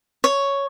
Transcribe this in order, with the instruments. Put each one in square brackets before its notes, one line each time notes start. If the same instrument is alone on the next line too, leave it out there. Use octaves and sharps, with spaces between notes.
[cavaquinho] C#5